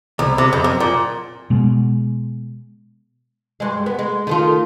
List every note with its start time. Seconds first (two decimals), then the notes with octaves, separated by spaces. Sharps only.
0.19 C2
0.38 C3
0.53 F2
0.64 F#2
0.80 A#2
1.50 B2 G#3
3.60 G2 G#3
3.86 B3
3.99 G#3
4.27 D#3 A3 F4